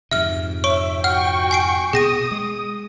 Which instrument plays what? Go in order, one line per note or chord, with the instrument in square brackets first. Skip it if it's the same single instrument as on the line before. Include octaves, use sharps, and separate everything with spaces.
[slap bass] F2 G#2 C3 [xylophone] E5 F6
[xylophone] C#5 C#6 D7 [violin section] E5
[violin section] F#4 G5 C#6 [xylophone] F#5 F6
[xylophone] G#5 C7 D7
[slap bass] B2 [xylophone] G#4 A#6 D#7 [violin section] D#6
[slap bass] G#3